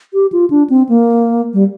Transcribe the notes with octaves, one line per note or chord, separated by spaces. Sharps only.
G4
F4
D4
C4
A#3
G3